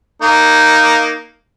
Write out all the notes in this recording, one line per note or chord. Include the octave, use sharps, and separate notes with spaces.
A#3 D#4